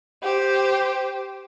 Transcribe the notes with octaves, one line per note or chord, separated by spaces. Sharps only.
G4 C5